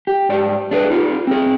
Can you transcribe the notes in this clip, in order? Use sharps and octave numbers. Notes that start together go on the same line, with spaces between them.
G4
G#2 G4 D5
D4 G#4 B4
D#4 F4 G4
C4 G#4